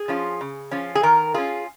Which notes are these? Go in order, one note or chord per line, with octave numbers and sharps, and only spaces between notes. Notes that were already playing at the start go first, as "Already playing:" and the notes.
Already playing: G#4
F3 C#4 F4
C#3
F3 C#4 F4
G#4
D#3 A#4
C#4 F4 G#4